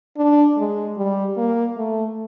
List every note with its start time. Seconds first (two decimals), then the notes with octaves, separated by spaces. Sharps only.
0.17 D4
0.58 G#3
0.97 G3
1.37 A#3
1.77 A3